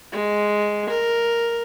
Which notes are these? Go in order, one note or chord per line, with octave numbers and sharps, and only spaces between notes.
G#3
A#4